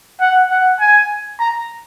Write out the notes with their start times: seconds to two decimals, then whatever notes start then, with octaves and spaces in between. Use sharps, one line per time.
0.21 F#5
0.50 F#5
0.80 G#5
1.40 A#5